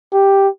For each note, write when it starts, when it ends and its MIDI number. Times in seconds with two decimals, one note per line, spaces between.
0.13 0.48 67